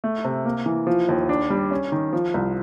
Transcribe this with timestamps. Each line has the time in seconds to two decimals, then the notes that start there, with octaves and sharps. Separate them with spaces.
0.04 A3
0.25 C3
0.45 A#3
0.66 E3
0.87 F3
1.09 D#2
1.29 D4
1.50 G3
1.71 C#4
1.92 D#3
2.13 F3
2.34 C2